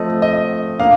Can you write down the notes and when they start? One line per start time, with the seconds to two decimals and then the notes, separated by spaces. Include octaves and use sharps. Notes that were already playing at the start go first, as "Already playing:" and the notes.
Already playing: F3 A3 C4 D#5
0.22 D#5
0.79 A#3 D4 F5